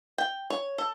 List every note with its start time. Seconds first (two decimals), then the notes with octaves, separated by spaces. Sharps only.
0.18 G5
0.50 C#5
0.78 A4